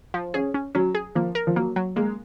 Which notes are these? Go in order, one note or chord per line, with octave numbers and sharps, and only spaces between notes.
F3
C#4 G#4
C#4
F#3 C#4
G#4
F3 A#3
A#4
F3
F#3 A#3
F#3
G#3 A#3